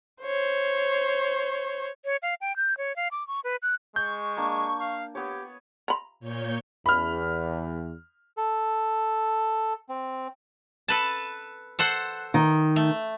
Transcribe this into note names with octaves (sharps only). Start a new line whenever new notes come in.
C5 C#5
C#5
F5
G5
G6
C#5
F5
D6
C#6
B4
F#6
G#3 C#6 G6
A#3 D4
F5
B3 G4 C#5
A#5 B5
A#2 C#5 G6
E2 B5 F6
A4
C4
A4 B4 A5
A4 C5 F#5
D#3
A3